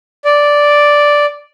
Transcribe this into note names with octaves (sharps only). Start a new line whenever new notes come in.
D5